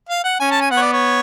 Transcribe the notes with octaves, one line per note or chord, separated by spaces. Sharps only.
F5
F#5
C#4 G#5
A5
G#5
B3 F#5
C#5
D5
C#5